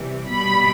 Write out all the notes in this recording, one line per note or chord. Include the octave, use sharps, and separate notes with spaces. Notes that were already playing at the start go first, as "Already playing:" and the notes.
Already playing: C3 E3 G3
B2 G3 B5